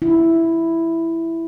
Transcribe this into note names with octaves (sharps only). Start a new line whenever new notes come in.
E4